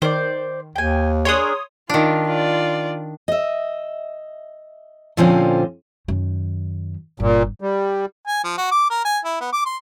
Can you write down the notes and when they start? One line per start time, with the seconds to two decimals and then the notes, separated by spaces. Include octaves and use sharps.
0.02 D#3 C5 D5
0.76 D#2 G5 G#5
1.25 D4 G#4 A#4 C#5 C6 D#6
1.90 D#3 D4 F4
2.27 F4 D5
3.28 D#5 E5
5.17 A#2 D3 F3 C4 C#4 F4
6.08 F#2 D#3
7.20 G1 A#2
7.61 G3
8.27 G#5
8.44 F3
8.58 F#4
8.72 D6
8.90 A#4
9.05 G#5
9.25 E4
9.41 B3
9.52 D6
9.66 C6